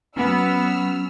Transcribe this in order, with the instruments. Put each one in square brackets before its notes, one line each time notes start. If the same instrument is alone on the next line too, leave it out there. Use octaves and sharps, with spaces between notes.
[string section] F#3 E6 F6 [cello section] B3 [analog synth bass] C#4